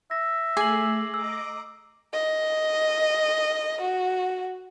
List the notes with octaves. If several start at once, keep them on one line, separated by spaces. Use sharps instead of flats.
E5 A#6
A3 G#4 G#5 D6 C7 F#7
D#5 A#5 D6 E6
D#5
F#4